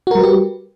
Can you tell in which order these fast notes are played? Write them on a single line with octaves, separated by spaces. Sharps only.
F#4 A#4 G3 B4 G4